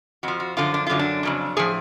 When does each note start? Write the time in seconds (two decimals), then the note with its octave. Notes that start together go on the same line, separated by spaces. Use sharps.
0.23 F2 F3 F#4
0.40 F#4
0.57 F#2 D3 F3 F4
0.74 D4
0.87 F#2 D3 F#3 F4
0.99 D4
1.23 F2 C#3 F#3
1.57 A2 F3 G#4